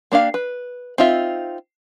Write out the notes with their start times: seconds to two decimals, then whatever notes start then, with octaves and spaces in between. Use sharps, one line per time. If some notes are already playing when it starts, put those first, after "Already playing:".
0.12 A#3 D4 G4 F5
0.34 B4
0.98 C4 D#4 F4 E5